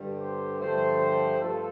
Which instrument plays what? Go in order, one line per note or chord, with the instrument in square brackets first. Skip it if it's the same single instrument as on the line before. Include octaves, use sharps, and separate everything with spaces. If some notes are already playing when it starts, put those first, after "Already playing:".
Already playing: [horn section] G2 D3 G3
G4 C5
G2 D3 F3 A3 G4 C5
G2 F3 A3 F4 A4